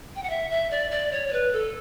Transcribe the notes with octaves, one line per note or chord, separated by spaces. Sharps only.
G5
F#5
E5
E5
D5
D5
C#5
C#5
B4
A4